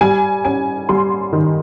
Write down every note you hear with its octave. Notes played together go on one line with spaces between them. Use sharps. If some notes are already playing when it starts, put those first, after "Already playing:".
G3 G#5
C#4 G#5
G3 C6
D#3